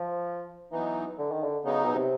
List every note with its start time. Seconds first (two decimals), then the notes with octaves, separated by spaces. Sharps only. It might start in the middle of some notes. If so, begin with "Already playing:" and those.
Already playing: F3
0.72 E3 F#3 B3 D#4
1.19 D3
1.31 D#3
1.43 D3
1.65 C#3 F#3 B3 D#4
1.85 B2
1.95 C3